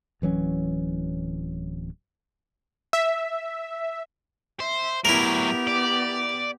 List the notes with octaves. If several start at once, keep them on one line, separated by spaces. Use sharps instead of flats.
D1 E3 F#3 C#4
E5
C5 E5
A2 F#3 B3 E4 G4 A#4
D5